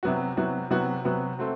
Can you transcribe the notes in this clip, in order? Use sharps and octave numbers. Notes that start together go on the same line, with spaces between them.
C3 F#3 B3 F#4
C3 F#3 B3 F#4
C3 F#3 B3 F#4
C3 F#3 B3 F#4
A3 C4 F#4